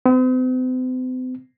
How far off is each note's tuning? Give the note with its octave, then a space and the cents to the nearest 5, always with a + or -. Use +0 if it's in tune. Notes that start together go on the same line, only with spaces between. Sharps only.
C4 -45